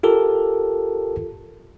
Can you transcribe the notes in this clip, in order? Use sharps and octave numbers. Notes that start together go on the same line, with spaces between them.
F4 G4 A4 A#4